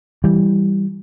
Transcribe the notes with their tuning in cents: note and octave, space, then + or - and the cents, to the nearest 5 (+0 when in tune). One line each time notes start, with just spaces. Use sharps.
E3 +0 G3 +0